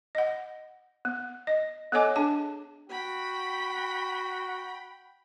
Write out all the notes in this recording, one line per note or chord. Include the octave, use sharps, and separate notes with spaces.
D#5 F#5
B3
D#5
B3 A4 C#5 D#5 G#5 D6
D4 G#4 A5
F#4 G5 B5